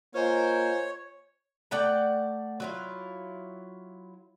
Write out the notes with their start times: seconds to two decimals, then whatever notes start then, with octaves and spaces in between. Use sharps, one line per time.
0.14 A#3 F4 C5 C#5 D#5 G#5
1.71 A3 D5 F#5 G5
2.60 F#3 E4 F4